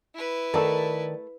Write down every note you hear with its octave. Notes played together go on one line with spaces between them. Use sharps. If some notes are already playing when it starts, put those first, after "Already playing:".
E4 B4
D#3 A3 A4 A#4 D5 A5